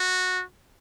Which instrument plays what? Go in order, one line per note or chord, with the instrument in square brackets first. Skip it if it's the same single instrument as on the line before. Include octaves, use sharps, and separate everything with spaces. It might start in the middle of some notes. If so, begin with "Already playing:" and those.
Already playing: [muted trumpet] F#4